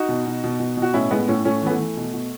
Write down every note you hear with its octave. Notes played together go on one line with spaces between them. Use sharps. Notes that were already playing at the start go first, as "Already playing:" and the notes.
Already playing: D#4 F#4
B2
B2
B2
B2
B2
F#4
A2 C#4 E4
A2 G#3 B3
A2 A3 C#4
A2 A3 C#4
E3 B3
A3
E3
B2
B2